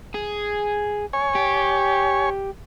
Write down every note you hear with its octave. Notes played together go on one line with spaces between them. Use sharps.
G#4
C#5 G#5
G4